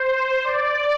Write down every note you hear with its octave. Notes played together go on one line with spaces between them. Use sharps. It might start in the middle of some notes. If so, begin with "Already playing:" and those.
Already playing: C5
C5
D5